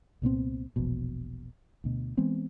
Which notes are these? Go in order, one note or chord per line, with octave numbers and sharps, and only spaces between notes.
C2 A#2 B3 C4
E1 A#1 B2
D2 B2
E3 G#3 B3 C4